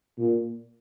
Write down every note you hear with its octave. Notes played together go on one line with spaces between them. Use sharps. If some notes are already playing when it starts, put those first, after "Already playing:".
A#2